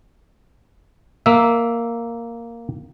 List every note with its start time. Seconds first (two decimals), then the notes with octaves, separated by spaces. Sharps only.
1.26 A#3 E5